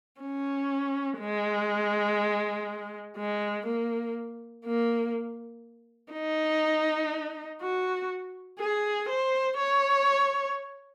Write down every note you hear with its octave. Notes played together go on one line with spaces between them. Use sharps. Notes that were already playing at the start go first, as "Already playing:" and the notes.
C#4
G#3
G#3
A#3
A#3
D#4
F#4
G#4
C5
C#5